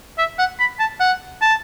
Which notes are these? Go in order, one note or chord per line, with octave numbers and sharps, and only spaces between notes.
E5
F#5
B5
A5
F#5
A5